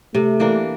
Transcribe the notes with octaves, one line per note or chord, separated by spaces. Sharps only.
C3 A3
E3 A#3 D4